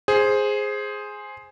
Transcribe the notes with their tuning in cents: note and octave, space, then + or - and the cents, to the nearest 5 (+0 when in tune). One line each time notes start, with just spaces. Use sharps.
G#4 +0 C5 +5